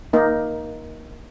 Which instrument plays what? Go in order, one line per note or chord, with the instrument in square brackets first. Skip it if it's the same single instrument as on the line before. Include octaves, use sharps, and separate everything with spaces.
[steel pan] A#3 D#4